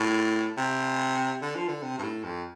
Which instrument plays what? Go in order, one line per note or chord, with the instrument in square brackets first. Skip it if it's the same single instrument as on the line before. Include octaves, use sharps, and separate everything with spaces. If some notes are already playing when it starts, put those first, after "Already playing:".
Already playing: [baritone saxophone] A2
C3
D3
F3
D3
C3
G2
A2
F2